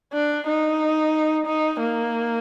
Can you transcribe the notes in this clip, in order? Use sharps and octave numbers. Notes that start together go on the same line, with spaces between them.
D4
D#4
D#4
A#3